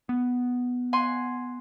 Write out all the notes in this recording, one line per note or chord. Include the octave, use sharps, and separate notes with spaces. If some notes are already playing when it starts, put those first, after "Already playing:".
B3
F#5 G#5 C6